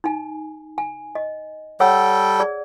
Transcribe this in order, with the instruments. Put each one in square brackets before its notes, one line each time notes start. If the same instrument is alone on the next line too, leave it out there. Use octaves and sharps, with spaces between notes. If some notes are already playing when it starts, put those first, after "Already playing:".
[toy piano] D#4 G#5
G#5
D#5
[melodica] G3 A4 G5 [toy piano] C#5 F#5 E6
[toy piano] G#4 D5